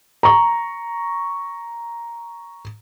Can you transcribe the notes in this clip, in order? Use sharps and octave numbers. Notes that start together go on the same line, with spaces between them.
A#5 C#6